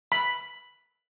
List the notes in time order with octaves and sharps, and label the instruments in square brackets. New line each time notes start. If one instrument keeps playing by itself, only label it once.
[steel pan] B5